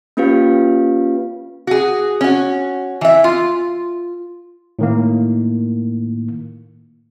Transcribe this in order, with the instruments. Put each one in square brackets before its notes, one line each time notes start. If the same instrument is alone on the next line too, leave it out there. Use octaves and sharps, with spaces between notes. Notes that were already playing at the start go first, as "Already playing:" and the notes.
[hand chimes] A#3 C#4 F4 G4 B4 F5
[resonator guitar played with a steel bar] F#4 G#4
C#4 F#4
E3 E5
F4
[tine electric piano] A2 D#3 A#3